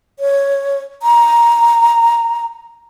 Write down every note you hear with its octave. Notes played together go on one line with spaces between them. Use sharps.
C#5
A#5